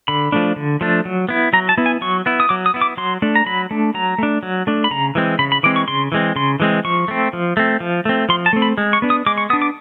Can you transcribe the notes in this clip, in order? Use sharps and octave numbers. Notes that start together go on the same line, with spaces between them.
D3 B5
F3 A3 D4
D3
F3 A3 D4
F#3
B3 E4
F#3 A#5
A5
B3 E4
G#5
F#3 C#6
B3 E4
D#6
F#3 D6
D#6
B3 E4
D6
F#3 C6
A3 D4
A#5
F#3 B5
A3 D4
F#3 A#5
A3 D4
F#3
A3 D4
B5
C#3 A#5
E3 G#3 C4
C#3 B5
B5
E3 G#3 C4 D6
C#6
C#3 C6
E3 G#3 C4
C#3 C6
E3 G#3 C4
F3 C#6
A3 C4
F3
A3 C4
F3
A3 C4
F3 C6
A5
A3 C4
B5
G#3
C#6
B3 D4
D#6
G#3 D6
C#6
B3 D4 D#6
D6